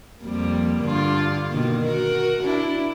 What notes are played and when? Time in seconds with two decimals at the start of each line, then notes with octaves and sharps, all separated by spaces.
0.22 F2 G3 A#3
0.81 G2 D3 F4
1.49 B2 D#3 A#3
1.85 F#4 A#4
2.43 D4 E4